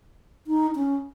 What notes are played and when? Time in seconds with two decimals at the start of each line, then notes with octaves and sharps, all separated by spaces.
0.47 D#4
0.75 C#4